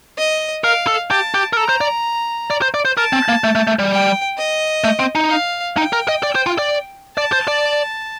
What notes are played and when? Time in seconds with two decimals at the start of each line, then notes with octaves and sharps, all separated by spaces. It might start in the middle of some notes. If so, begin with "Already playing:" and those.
0.18 D#5
0.63 A#4 F5
0.87 A4
1.11 G4 A5
1.34 G4
1.53 A#4
1.57 A4 A#5
1.69 C5
1.81 D5
2.50 D5
2.62 C5
2.74 D5
2.85 C5
2.97 A#4 A5
3.13 C4
3.28 A#3
3.44 A3
3.55 A3
3.67 A3
3.79 G3
3.91 G5
4.38 D#5
4.84 A3
4.99 C4
5.15 D#4
5.30 F5
5.77 D#4 G5
5.93 A#4
6.08 D#5
6.23 D5
6.35 C5
6.46 F4
6.58 D5
7.17 D5 A5
7.32 C5
7.48 D5